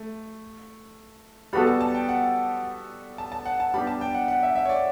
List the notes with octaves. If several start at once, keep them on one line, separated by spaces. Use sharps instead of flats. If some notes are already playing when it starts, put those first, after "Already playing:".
Already playing: A3
G3 B3 F#4 A4 B5
A5
A5
G5
F#5
A5
A5
F#5
A5
G3 B3 D4 G4 B5
A5
G5
F#5
F#5
E5
E5
C#5
D5